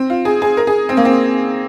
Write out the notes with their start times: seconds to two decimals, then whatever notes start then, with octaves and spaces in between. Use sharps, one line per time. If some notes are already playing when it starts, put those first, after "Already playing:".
Already playing: C4
0.10 F4
0.25 G#4
0.42 G#4
0.57 A#4
0.67 G#4
0.89 C4
0.97 A#3
1.05 C4